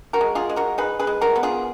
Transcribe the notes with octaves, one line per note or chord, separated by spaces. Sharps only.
F#4 A#4
G#3
F4 G#4
G#3
F#4 A#4
D#4 G#4 B4
G#4 B4
G#3
F#4 A#4
B3
F4 G#4